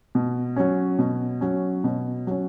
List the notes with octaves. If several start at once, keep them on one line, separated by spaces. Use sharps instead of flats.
B2
F#3 C#4
B2
F#3 C#4
B2
F#3 C#4